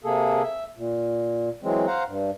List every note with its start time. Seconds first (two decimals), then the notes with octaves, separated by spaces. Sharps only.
0.04 C3 A#3 G#4 A4
0.42 E5
0.77 A#2
1.63 E3 F#3 G#3 C4
1.87 C5 F5 F#5 A#5
2.07 G2